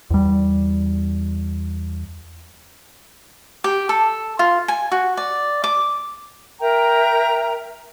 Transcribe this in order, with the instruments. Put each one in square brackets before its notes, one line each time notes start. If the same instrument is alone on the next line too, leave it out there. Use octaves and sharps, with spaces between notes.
[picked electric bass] E2 G3
[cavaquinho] G4
A4
F4
G#5
F#4
D5
D6
[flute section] A#4 E5 G5 A#5